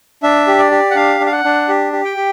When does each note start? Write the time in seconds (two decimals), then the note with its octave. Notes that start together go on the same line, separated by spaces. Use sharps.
0.23 D4 E5
0.47 G4
0.59 D5
0.71 G4
0.91 F#5
0.95 D4 F5
1.20 D4
1.26 F5
1.32 F#5
1.44 D4
1.69 G4
1.92 G4
2.05 G5
2.17 G4